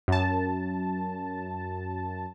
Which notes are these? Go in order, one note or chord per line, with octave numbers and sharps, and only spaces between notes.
F#2 A5